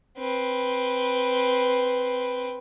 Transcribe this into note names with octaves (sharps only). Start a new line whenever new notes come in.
C4 B4